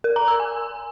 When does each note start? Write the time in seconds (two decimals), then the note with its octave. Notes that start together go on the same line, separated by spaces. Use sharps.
0.04 A#4
0.16 A#5
0.28 E6
0.40 G#5